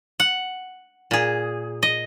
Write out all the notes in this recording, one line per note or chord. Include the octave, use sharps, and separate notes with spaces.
F#5
A#2 G#4
D#5